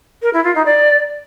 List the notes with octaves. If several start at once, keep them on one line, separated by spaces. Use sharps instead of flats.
A#4
E4
F4
D#4
D5